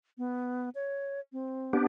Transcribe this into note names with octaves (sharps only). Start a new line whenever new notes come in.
B3
C#5
C4
B3 D4 G4